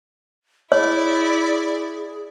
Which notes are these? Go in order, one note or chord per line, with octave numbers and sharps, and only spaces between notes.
E4 G#4 C#5 D5